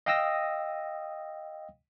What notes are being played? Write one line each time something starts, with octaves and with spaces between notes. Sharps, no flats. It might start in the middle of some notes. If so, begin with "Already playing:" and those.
D#5 F5 G5 D#6 E6 A#6